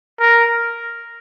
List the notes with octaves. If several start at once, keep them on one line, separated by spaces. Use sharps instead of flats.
A#4